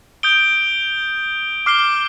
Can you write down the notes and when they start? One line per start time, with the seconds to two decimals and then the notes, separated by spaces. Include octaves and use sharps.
0.23 D#6 G6 D7 G7
1.66 D6 F6 C7 G7